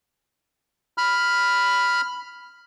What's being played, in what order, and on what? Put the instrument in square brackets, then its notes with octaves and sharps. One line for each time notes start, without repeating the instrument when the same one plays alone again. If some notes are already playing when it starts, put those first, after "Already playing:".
[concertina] B5 F6